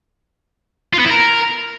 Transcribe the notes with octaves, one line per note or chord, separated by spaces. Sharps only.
F4
B3
E4
A#4